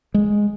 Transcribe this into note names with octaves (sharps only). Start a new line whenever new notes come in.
G#3